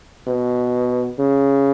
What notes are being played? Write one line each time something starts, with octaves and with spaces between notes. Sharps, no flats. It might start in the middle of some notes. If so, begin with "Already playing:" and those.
B2
C#3